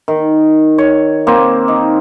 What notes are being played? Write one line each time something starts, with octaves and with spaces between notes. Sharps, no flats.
D#3
C#5
A#3 C4
D#4